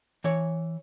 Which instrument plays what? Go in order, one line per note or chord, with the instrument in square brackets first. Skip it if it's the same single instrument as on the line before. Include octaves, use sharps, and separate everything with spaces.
[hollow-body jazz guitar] E3 C#5